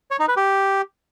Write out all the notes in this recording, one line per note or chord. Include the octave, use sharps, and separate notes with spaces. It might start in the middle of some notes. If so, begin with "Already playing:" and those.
C#5
D#4
B4
G4